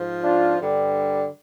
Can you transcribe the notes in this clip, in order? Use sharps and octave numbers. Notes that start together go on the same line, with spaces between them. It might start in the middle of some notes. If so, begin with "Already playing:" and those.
Already playing: G#2 F3
D4 F4
G2 D3 G3